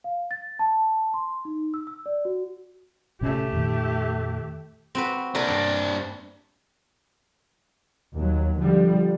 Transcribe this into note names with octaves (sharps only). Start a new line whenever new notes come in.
F5
A6
A5
C6
D#4
E6
E6
D5
F#4
A1 C3 A3 C#4 G4
F2 A#2 D#3
C4 F#4 B4
C4 D4 A#4 B4 D5
G2
D#2 F#3
D3 F3 G3